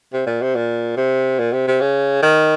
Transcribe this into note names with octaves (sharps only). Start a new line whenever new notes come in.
C3
A#2
C3
A#2
C3
A#2
C3
C3
C#3
D#3